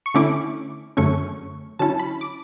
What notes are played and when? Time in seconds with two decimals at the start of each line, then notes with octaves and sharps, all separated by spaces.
0.06 C#6
0.14 D3 A3 C#4 E4 D6
0.97 F#2 D3 A3 C#4 C#6
1.79 D3 F#3 C#4 E4 A5
1.99 B5
2.21 D6